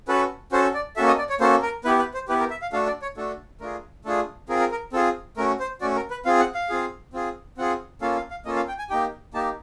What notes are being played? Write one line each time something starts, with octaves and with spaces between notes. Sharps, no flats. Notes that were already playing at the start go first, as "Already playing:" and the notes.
C#4 F#4 A4 B4
C#4 F#4 A4 C5
D5
A#3 C#4 F#4 A4 E5
D#5
D5
C#5
A#3 C#4 F#4 A4 C5
A#4
B3 E4 G4 B4
B4
C5
B3 E4 G4 B4
A#4
E5
F5
A3 D4 F#4 A4 F5
D5
C#5
A3 D4 F#4 A4
A3 D4 F4 G#4 A#4
A3 D4 F4 G#4 A4
C4 F4 G#4 A#4
A#4
A#4
C4 F4 G#4 A4
A3 C#4 F#4 A#4
C5
A3 C#4 F#4 D5
A#4
B4
C4 F4 G#4 F5
F#5
F5
C4 F4 G#4
C4 F4 G#4
C4 F4 G#4 F#5
A#3 C#4 F4 A4 F5
F5
F5
A#3 C#4 F4 A4 D#5
F5
G5
G#5
A#3 D#4 G4 G5
A#3 D#4 G4 A5